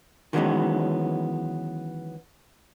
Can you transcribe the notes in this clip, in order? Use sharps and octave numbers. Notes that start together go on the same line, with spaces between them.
D#3 E3 F#3 G#3 B3 C#4